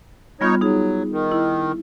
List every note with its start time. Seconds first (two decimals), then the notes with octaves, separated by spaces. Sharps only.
0.41 G3 B3 D#4 F4 C#5
0.61 F#3 D#4 G#4
1.12 D#3
1.32 E4